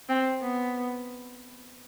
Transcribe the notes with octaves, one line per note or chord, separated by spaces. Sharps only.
C4
B3